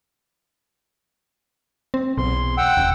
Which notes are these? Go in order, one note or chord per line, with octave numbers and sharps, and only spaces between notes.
C4
B1 E2 C6
F#5 G5 E6
D#1